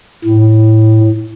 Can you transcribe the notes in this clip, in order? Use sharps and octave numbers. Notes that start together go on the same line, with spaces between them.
A2